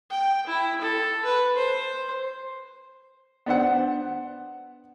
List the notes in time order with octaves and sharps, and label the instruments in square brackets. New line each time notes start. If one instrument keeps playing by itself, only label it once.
[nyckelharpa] G5
E4
A4
B4
C5
[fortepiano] B3 D4 C5 F#5